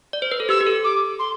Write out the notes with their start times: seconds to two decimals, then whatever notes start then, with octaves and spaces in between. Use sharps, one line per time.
0.13 D5
0.22 C5
0.32 B4
0.40 A4
0.49 G4 E6
0.61 G4
0.67 A4
0.84 D6
1.19 C6